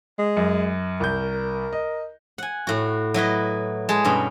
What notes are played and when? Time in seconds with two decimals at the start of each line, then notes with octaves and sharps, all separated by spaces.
0.19 G#3
0.37 F#2
1.00 C2 A#4 G6
1.73 D#5
2.38 F#5 G#5
2.67 A2 F#4
3.14 F#3 E4 B4 D#5
3.89 G#3 G#4 A5
4.04 G2 B2 C#4